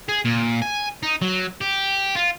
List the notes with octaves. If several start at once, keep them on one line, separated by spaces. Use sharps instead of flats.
G#4
A#2
G#5
D#4
F#3
G4
F4